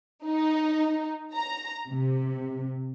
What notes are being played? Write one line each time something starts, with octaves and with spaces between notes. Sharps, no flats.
D#4
A#5
C3